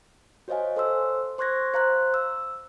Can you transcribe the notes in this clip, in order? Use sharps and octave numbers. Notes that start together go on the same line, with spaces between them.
F#4 C5 C#5 D#5 F5 G#5
A4 C5 C6 E6
C5 C6 C#6 F#6 G#6 A#6
C5 F5 A#5 C6 F#6
E6